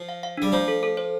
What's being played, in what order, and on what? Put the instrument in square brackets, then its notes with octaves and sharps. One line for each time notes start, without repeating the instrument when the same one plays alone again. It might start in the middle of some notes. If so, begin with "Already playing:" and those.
Already playing: [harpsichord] F3
[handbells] F5
F5
[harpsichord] G3 [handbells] D4
[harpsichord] F3 [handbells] A3
[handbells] A4
A4
C5